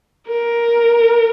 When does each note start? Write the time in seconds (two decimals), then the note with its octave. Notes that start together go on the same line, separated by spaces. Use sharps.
0.28 A#4